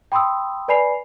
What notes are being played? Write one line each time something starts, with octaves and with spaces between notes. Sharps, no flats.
G5 B5 C6 D#6 E6
B4 D5 G#5 B5 C7 F7